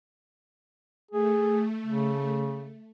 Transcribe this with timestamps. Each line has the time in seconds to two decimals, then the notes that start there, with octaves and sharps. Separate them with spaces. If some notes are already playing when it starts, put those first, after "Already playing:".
1.11 A3 G#4
1.86 C#3